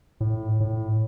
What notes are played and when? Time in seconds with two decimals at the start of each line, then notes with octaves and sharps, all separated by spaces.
0.20 A2
0.60 A2